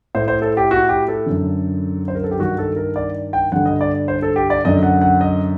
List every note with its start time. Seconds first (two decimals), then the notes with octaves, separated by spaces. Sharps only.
0.15 A2 C5
0.28 C5
0.42 A4
0.57 G4
0.71 F#4
0.89 G4
1.08 A4
1.26 F#2 D3
2.08 C5
2.15 A#4
2.24 A4
2.31 G4
2.39 G2 D#3 F#4
2.58 A4
2.76 A#4
2.96 D5
3.33 G5
3.52 G2 D3 F#5
3.66 D#5
3.81 D5
4.08 C5
4.22 A4
4.36 G4
4.50 D5
4.65 F#2 D3 D#5
4.83 F#5
5.02 F#5
5.21 D#5